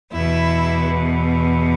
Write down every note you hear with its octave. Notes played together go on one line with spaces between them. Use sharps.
E2 B2 E4